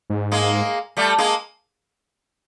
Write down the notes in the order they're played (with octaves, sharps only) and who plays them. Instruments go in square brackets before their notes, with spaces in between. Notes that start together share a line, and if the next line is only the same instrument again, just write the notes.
[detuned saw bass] G#2
[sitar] G#3 A#3
G3 A3
G#3 A#3